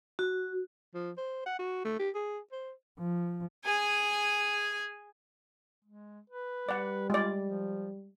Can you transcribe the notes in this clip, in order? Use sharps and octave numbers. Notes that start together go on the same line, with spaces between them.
F#4
F3
C5
F#5
F#4
A3
G4
G#4
C5
F3
G#4 G#5
G#3
B4
G3 D5 F#5
G#3 F4 D5
F3